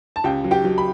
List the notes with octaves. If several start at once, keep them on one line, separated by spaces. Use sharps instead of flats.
A5
C#2 G4 G5
F#3
G4 G5
F#3
B5